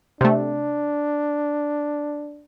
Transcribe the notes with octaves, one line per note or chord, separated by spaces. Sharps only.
C3 A3 D4